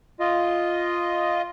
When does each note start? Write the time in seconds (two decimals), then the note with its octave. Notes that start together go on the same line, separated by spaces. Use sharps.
0.20 F4 D#5